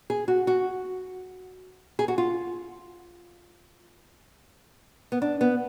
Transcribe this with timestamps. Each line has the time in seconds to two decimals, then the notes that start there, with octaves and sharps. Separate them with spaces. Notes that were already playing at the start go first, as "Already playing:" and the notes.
0.10 G#4
0.28 F#4
0.47 F#4
1.99 G#4
2.08 F#4
2.18 F4
5.12 B3
5.22 D4
5.41 B3